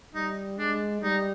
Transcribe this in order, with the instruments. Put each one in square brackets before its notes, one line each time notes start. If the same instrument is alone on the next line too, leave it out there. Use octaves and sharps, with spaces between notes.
[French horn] G3 [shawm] D#4
[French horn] G#3 [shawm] D4
[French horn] G3 [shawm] D#4